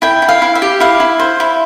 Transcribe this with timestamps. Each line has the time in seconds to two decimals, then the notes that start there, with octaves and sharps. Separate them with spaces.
0.02 E4 G5
0.22 E4
0.29 F5
0.42 E4
0.55 E5
0.62 G4
0.80 E4 F5
1.00 E4
1.20 C5
1.40 E4